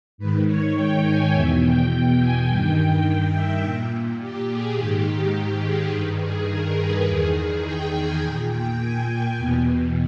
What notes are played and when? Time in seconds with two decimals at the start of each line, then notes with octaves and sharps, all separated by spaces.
0.18 G#2 D#3 B4
0.47 C#5
0.76 G5
1.04 G#5
1.33 E2 B2 E5
1.63 G5
2.19 G#5
2.48 G2 D#3 G5
3.05 G5
3.33 E5
3.63 A#2
4.20 G4
4.49 G#4
4.77 G#2 D#3 G4
5.64 G#4
5.92 G2 D#3 B4
6.20 G#4
6.50 A#4
6.78 B4
7.07 E2 D#3 G#4
7.64 G5
7.93 G#5
8.22 A#2 G5
8.50 G5
8.79 G#5
9.07 G5
9.37 E2 B2